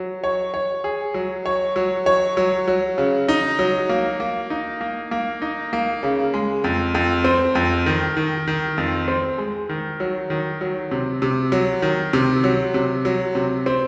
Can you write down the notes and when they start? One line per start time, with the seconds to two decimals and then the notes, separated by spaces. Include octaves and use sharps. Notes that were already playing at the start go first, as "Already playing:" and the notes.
Already playing: F#3
0.24 C#5
0.54 C#5
0.84 G#4
1.14 F#3
1.46 C#5
1.76 F#3
2.06 C#5
2.37 F#3
2.68 F#3
2.98 C#3
3.28 D#4
3.59 F#3
3.89 A#3
4.20 A#3
4.50 D#4
4.81 A#3
5.11 A#3
5.42 D#4
5.73 A#3
6.03 C#3
6.34 G#3
6.64 F2
6.95 F2
7.24 C4
7.55 F2
7.86 D#3
8.17 D#3
8.48 D#3
8.78 F2
9.08 C4
9.38 G#3
9.69 D#3
10.00 F#3
10.30 D#3
10.61 F#3
10.91 C3
11.22 C3
11.52 F#3
11.82 D#3
12.13 C3
12.44 F#3
12.74 C3
13.05 F#3
13.35 C3
13.66 C4